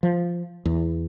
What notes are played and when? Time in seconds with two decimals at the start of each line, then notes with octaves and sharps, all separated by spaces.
0.03 F3
0.65 E2